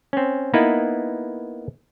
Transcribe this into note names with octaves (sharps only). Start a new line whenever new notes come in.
C4 C#4
A#3 B3 D#4 E4 B4